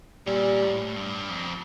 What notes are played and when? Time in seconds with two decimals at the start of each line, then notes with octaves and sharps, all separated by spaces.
0.27 A#2 G3
0.61 A2
0.96 G2
1.30 F2